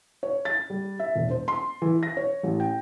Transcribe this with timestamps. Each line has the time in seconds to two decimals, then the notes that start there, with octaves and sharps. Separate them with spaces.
0.23 C#5
0.45 A6
0.70 G3
1.00 E5
1.16 E1
1.31 C5
1.48 C6
1.82 E3
2.03 A#6
2.17 C#5
2.43 A1
2.60 G5